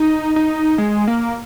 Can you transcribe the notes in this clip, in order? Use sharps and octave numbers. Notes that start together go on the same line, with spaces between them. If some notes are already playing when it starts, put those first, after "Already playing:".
Already playing: D#4
D#4
G#3
A#3